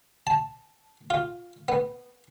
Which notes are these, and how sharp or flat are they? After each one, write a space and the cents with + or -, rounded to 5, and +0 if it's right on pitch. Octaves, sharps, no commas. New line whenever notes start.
A5 -5
F4 +5
B3 -5